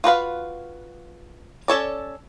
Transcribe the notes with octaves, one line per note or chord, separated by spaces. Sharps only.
F4 F#4 B4 F5
C#4 A4 C#5 D5